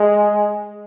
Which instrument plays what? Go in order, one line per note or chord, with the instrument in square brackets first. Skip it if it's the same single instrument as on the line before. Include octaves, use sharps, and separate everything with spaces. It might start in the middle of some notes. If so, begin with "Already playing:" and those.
Already playing: [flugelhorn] G#3